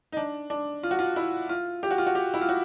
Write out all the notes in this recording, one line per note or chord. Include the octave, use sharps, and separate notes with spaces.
D#4
D4
D4
F4
F#4
F4
E4
F4
G4
F#4
F4
F#4
G4
E4
F4
F#4